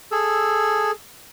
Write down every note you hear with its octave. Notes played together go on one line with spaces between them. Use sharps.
G#4 A4 E6